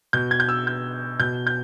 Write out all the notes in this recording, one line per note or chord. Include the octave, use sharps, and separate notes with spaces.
B2 G6
G#6
G6
E6
G6
B2 G6
G6